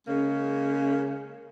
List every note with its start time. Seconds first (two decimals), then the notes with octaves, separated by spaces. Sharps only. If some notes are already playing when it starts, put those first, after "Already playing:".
0.08 C#3 G#3 A#3 C#4